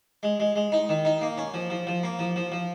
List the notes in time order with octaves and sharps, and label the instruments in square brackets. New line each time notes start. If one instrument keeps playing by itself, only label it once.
[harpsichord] G#3
G#3
G#3
D#4
D#3
D#4
A#3
C#4
F3
F3
F3
A#3
F3
F3
F3